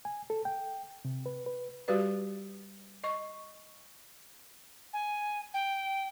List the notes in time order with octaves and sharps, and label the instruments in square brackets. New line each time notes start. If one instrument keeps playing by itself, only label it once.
[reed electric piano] G#5
A4
G5
C3
B4
B4
[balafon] G3 F#4 G4 B4 D5
D#5 C#6
[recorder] G#5
G5